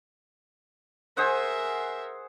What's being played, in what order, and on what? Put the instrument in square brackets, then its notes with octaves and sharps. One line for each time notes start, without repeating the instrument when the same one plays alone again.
[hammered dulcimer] G#4 C5 F#5 [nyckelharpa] A#4 E5